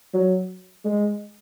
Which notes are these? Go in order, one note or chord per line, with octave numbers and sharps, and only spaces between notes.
F#3
G#3